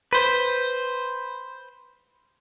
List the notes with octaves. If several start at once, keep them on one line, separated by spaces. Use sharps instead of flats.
B4 C5